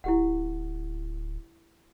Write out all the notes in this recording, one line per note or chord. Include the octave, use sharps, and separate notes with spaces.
D1 E4 G4 F#5